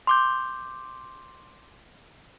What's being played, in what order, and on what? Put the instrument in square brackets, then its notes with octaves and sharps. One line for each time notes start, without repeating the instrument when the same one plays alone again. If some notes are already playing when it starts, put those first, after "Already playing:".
[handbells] C6 D6 G6